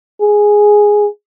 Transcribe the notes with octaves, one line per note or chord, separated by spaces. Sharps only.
G#4